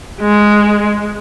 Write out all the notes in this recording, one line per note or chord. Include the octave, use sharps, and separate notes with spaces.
G#3